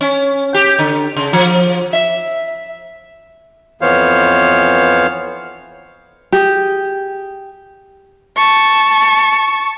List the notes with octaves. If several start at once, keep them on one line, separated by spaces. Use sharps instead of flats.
C#4
G4
D3
C#3
F3
E5
F2 E3 B3 C5 C#5 F5
G4 G#4
A5 C#6